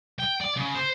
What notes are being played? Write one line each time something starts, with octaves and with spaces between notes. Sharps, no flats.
G5
D5
C#3
C5